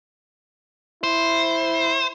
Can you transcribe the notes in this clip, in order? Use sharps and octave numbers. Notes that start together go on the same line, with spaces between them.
E4 C5